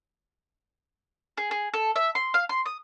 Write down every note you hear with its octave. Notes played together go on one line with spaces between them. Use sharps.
G#4
G#4
A4
E5
C6
F5
C6
D#6